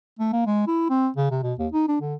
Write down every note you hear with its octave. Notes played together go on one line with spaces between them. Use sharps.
A3
A#3
G#3
E4
C4
C#3
C3
B2
D#2
D#4
D4
D3